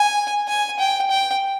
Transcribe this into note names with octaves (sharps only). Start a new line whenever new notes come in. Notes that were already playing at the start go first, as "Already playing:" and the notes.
Already playing: G#5
G#5
G5
G5